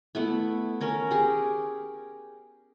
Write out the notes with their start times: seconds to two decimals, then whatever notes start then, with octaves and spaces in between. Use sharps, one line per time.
0.15 A3 B3 E4
0.81 C#4 A#4 C#5
1.11 G4 G#4